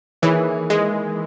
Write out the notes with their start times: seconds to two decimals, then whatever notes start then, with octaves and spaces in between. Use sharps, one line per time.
0.22 D#3 E3 A#3 E4 G#4 C#5
0.70 G#3